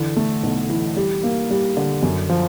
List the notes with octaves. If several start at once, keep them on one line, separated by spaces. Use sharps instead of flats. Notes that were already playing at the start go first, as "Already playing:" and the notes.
Already playing: D3 E3
A3
B1
E3
G3
A#3
G3
D3
F#2
F3